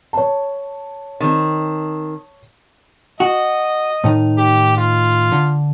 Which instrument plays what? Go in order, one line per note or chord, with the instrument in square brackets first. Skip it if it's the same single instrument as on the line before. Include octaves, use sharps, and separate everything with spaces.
[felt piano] C#5 A5
[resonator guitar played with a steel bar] D#3 C4
[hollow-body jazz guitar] F#4 [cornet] D#5
[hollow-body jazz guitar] A2 D#3 D#4
[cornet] G4
F4
[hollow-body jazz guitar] D3